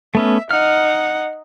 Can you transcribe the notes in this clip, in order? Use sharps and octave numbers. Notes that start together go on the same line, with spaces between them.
A3 B3 C#4 E5
D#4 F#5 F6